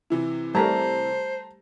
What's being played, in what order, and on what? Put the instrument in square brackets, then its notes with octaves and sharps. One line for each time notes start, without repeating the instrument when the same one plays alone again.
[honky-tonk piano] C3 E3 E4
[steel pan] G3 A3 A#4 [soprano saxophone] C5 [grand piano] A5 A#5